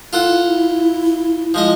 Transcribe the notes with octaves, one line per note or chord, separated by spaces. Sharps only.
E4 F4 A4 F#5
F3 G#3 D#5